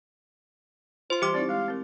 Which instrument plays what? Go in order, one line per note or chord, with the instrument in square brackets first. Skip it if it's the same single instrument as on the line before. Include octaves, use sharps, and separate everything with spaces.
[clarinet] F4 [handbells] C5 C6
[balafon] E3 G3 G5 [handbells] G4 D6
[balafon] C4 D#4 E4 [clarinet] D5
[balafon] G#3 [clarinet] F5
[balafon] C4 A#4